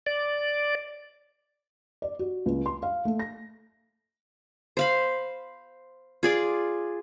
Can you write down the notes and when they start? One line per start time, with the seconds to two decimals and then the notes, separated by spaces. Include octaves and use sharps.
0.06 D5
2.02 D5
2.19 F#4
2.46 C#2
2.66 C6
2.83 F5
3.05 A3
3.19 A#6
4.77 C5 F5 B5
6.23 F4 G#4 D5